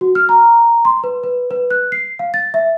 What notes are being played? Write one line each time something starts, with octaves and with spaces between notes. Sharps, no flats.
F#4
F6
A#5
C6
B4
B4
B4
F#6
C7
F5
A6
E5